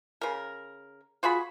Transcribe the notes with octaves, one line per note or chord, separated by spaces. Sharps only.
C#3 A#4
F4 F#4 G#4 B5